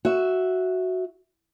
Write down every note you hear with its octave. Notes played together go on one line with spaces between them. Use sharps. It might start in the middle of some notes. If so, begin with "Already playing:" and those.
F#4 E5